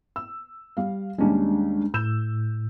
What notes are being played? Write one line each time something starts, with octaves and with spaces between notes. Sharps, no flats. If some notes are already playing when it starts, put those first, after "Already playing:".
E6
G3 F5
D#2 G3 G#3 C#4 D4
A2 E6 G6 E7